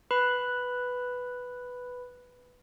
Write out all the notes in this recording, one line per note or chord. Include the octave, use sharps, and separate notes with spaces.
B4 B5